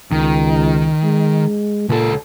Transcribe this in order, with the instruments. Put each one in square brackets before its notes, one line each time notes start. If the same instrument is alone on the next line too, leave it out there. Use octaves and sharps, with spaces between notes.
[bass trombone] C#2 [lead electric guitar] D#3
[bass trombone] G#3
[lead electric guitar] C#2 A4 [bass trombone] A#2